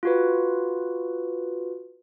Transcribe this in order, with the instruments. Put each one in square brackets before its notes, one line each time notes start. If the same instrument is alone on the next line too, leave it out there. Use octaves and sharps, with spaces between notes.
[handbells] F4 F#4 B4